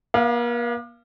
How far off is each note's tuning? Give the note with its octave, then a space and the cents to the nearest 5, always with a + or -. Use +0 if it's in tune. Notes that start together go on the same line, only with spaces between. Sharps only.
A#3 +45 F5 -20